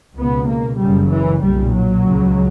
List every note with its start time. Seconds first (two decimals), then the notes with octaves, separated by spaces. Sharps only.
0.15 C#2 B2 B3
0.47 A#3
0.78 F#1 F#2 C#3 G3
1.10 E3
1.42 B1 A#2 G3
1.72 F#3
2.05 C#2 C#3